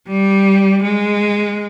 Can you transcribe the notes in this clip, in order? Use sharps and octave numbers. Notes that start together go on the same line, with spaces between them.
G3
G#3